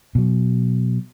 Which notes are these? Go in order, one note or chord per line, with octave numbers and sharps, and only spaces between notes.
B2 F#3